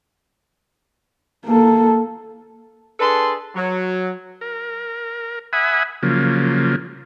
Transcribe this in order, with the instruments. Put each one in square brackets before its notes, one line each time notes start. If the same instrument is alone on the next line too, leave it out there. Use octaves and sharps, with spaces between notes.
[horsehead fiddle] A#3 A4
[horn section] D4 G#4 A4 B4 A5 C6
F#3
[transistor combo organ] A#4
E5 F#5 G#5 B5 D#6
C#3 F3 F#3 A#3